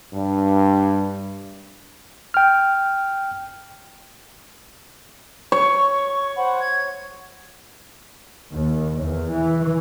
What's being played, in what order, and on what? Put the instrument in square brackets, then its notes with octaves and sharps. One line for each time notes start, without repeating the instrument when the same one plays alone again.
[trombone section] G2
[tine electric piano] G5 F6
[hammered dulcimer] C#5 [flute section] C#6
[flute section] C5 F#5 B5
G#6
[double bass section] D#2
E2
E3